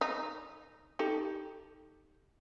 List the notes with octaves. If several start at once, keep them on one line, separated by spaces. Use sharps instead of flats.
D#4
D#4 G4 A4